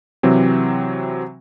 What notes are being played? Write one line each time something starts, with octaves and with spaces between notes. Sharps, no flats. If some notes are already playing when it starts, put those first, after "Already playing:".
C3 E3 F#3 C4